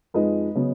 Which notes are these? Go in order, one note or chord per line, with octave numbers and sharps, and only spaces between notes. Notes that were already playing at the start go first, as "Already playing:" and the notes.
F2 F3 G#3 D#4 B4 D#5
C#3 F#3 B3